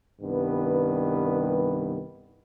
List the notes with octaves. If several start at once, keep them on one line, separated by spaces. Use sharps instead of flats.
C2 G2 D#3 B3 B4